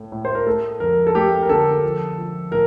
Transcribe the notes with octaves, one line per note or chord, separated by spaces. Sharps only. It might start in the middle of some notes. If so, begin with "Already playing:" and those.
Already playing: A2 A3
A2
C5
A#4
A3 A4
F2 A#4
A4
A3 G4
A#4
D3 A4
F3
F3
A2 A#4